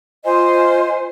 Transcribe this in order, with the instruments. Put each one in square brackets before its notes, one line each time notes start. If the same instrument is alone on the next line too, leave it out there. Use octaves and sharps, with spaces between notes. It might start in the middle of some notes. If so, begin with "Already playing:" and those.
[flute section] F4 D#5 G#5 [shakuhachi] C5